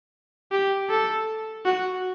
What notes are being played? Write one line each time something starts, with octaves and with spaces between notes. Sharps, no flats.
G4
A4
F#4